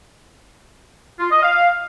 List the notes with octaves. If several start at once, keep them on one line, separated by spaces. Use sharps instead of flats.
F4
D#5
F5